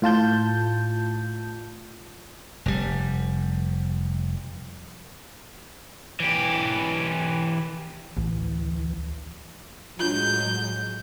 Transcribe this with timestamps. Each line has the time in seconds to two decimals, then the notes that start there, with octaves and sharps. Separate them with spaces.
0.02 A2 F4 A5 G6
2.66 F1 G3
6.20 E3 G4
8.17 A1 D2 E3
10.00 A2 F#3 G#3 D4 F4 G6